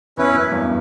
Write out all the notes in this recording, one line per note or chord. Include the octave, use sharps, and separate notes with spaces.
E2 C#4 E4 B4
F#2
E2 G2